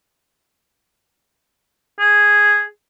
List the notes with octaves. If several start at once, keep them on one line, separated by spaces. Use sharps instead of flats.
G#4